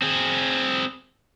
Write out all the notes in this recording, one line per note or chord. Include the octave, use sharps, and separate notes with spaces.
C4 G#4